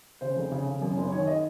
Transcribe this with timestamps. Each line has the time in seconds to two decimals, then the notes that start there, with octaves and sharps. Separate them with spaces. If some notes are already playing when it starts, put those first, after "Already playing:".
0.21 C#3 C5
0.36 F1
0.52 C#3
0.67 C#3
0.82 F#2
0.97 F#1
1.12 D#3 C#5
1.27 D#5